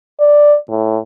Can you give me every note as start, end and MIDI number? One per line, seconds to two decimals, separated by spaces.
0.20 0.57 74
0.69 0.98 45